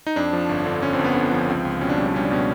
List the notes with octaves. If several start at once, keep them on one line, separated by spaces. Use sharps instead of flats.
D#4
F2 D4
F3
G1
D3
D3 C#4
C4
G1
B3
D3
F3
C#4
C#2 C4
C#2
B2 C#4
D4
G3 C#4
D4
G3 C#4
D4
B2 C#4